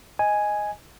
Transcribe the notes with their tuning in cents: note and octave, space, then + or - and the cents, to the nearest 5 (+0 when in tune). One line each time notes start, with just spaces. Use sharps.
D#5 +0 G#5 +0